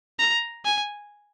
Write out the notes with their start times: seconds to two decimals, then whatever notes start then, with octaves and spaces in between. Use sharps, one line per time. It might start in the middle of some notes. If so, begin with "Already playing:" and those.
0.19 A#5
0.65 G#5